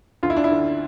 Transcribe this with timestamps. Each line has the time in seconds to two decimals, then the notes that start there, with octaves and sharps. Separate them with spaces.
0.23 D2 F4
0.30 E4
0.37 D4
0.44 E4
0.51 D3